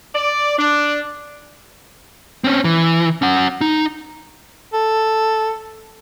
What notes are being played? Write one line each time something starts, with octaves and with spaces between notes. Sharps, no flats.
D5
D4
C4 C#4
E3
C#4 F#5
D#4
A4